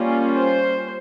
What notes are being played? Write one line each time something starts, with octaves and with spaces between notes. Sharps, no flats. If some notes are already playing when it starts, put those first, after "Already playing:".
Already playing: G3 A#3 C#4 F4
C5